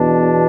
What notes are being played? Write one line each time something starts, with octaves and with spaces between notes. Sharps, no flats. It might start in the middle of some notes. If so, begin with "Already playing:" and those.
Already playing: E2 B2 D4